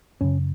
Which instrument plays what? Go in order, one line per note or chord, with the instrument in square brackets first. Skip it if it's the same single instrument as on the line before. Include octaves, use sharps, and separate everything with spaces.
[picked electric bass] F#2 C#3 C#4